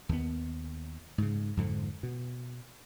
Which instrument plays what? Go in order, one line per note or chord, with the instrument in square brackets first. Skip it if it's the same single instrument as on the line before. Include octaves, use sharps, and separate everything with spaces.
[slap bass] D#2 B3
G#2 C#3
F2 G#2 D3 F3
B2